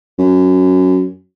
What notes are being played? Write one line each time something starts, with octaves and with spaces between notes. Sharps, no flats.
F#2